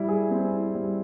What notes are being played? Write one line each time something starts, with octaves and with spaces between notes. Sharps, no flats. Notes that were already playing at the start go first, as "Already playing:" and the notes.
Already playing: G3 E4
G#4
C4
E4
G3